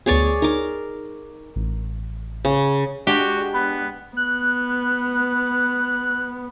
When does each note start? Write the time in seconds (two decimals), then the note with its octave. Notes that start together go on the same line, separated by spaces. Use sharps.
0.06 D2 B3 G#4 C#5 D5
0.42 D#4 A#4 D6
1.56 A1
2.45 C#3
3.07 G#3 D4 F#4 G4
3.54 B3 B5 F#6
4.17 B3 F#6